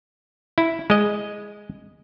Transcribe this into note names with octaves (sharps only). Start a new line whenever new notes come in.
E4
G#3 D#5